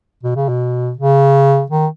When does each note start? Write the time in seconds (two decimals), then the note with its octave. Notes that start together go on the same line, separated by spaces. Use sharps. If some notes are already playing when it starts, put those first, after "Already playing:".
0.23 B2
0.36 C#3
0.49 B2
0.97 C#3
1.70 D#3